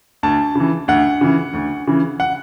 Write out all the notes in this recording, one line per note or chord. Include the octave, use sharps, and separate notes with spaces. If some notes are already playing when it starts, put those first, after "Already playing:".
D2 A5
C#3 E3
D2 F#5
C#3 E3
D2
C#3 E3
F#5